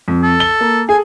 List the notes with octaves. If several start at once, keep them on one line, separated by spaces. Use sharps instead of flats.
F2
A4
G7
A#3
G#4 A4 G#5